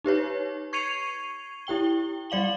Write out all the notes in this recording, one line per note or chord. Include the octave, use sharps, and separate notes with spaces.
D#4 G4 B4 C#5
C#6 G#6 C7 C#7 D#7 F7
E4 G4 G5 G7
G3 D5 F5 F#7 G7